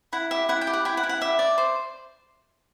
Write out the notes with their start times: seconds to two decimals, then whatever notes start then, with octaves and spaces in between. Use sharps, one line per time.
0.13 E4 F#5
0.31 G4 E5
0.49 E4 F#5
0.61 G5
0.67 G4
0.73 F#5
0.85 E4 G5
0.97 F#5
1.03 E4
1.09 F#5
1.21 G4 E5
1.39 D5
1.58 C5